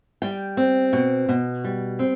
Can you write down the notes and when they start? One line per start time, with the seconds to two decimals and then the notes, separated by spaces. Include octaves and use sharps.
0.22 G3 G5
0.57 C4
0.93 B2
1.29 B2
1.64 G3
1.99 C4